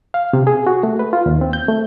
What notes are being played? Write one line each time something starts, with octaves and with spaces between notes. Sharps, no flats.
F5
C3
G#4
F#4
A3
B4
F4
D#2
C4
G6
A3